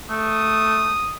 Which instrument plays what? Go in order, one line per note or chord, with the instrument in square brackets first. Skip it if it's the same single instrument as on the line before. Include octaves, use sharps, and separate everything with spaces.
[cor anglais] A3 [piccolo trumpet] D#6